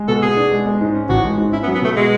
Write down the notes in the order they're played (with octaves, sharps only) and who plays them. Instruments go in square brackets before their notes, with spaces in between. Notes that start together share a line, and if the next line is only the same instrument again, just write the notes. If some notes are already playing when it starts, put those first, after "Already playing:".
Already playing: [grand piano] G#3
[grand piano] B2 [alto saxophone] A4
[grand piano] B2 [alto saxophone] G#4
[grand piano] D4
G#3
G#3
G#2
C#4
[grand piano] A1 [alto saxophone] F#4
[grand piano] G#3
G#2
[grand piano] C#4 [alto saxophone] E4
[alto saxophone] B3
[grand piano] F#3
[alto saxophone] B3
[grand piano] B2 [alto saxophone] A3
[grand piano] B2 [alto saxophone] G#3